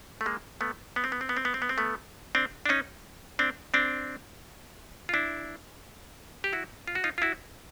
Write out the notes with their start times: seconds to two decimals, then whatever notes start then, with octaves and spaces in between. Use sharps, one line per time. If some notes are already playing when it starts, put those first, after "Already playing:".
0.21 A3
0.26 G#3 A#3
0.61 A3 B3
0.96 B3
1.04 C4
1.12 B3
1.21 C4
1.29 B3
1.37 C4
1.45 B3
1.54 C4
1.62 B3
1.69 C4
1.78 A3 B3
2.35 C4 D4
2.66 D4
2.69 C#4 D#4
3.39 C4 D4
3.74 C4 D4
5.09 F4
5.14 D4 E4
6.44 G4
6.53 E4 F#4
6.88 F4
6.95 F#4
7.04 D#4 F4
7.18 F4
7.22 E4 F#4